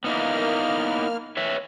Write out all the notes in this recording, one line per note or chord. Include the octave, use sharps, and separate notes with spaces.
A#3 B3 D#4 E4 F6
B4 C#5 E5